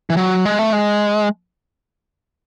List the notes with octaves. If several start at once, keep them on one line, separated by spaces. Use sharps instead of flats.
E3
F#3
G#3
A3
G#3